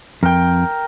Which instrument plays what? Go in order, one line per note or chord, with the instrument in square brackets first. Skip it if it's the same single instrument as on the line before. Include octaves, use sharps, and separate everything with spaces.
[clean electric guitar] F2 [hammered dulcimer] A#4 G5